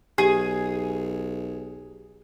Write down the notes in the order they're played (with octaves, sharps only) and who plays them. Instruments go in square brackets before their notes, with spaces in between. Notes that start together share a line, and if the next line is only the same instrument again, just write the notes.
[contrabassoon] B1 [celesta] G4 [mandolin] G#4